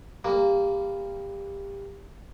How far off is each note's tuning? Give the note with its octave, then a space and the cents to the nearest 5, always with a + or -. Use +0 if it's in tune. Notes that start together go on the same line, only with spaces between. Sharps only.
G3 +20 A#3 -10